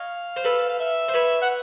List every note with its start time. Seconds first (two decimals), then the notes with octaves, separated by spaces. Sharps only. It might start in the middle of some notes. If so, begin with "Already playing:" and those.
Already playing: C#5 D#5 F5
0.36 C5
0.44 A4 B4
0.69 F5
0.80 E5
1.09 C5
1.14 B4 C#5
1.42 F#5